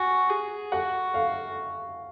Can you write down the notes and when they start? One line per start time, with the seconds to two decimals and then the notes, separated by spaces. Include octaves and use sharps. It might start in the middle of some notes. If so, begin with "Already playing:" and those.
Already playing: F#4 G#5
0.30 G#4
0.72 F#4 F#5
1.14 F5